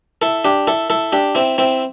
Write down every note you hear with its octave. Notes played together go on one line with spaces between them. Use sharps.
E4 A4
D4 G4
E4 A4
E4 A4
D4 G4
C4 E4
C4 E4